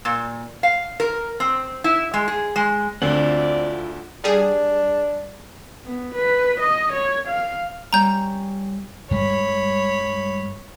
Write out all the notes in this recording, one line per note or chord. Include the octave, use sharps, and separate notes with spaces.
A#2
F5
A#4
C4
E4
G#3
G#4
G#3
D2 D3 C4 E4 F4 D5 F#5
G3 D4 G#4
B3
B4
D#5
C#5
F5
G3 C#4 A#5 G6
G2 G3 G#3 C#5 B5